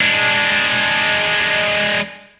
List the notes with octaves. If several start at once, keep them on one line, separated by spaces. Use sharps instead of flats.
G#3 D4